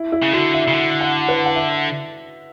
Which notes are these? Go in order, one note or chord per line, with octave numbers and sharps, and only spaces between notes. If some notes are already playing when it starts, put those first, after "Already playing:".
Already playing: E4
E4
C#3
D3 F#4
E5
C#3
D3
F#5
B4
F#5
E5